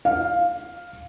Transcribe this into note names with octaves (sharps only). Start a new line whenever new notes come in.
F5